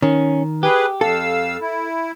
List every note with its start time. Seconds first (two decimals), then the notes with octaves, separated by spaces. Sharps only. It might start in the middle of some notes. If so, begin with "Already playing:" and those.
0.02 D#3 C#4
0.63 G4 G#4 B4
1.01 F2 A4 F5 E6
1.61 E4